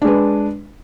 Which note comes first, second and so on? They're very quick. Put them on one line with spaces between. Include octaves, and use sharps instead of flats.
D4 G#3 B4